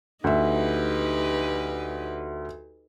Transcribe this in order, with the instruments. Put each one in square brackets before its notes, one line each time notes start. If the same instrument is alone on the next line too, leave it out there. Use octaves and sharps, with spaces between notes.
[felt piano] D2 E5 [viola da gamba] D#4 G4 B4